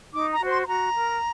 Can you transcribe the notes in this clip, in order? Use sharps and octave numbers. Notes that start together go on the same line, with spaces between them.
D#4 D6
A#5
F#4 C5
C6
C6
F#4 A#5
A#4